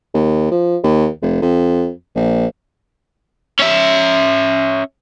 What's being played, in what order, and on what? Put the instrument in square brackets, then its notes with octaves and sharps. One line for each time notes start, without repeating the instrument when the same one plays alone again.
[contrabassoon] D#2
F3
D#2
F1
F2
A#1
[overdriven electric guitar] C#4 E5